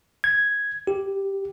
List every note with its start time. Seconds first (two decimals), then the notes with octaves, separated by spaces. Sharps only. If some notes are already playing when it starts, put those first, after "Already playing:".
0.24 G#6
0.87 G4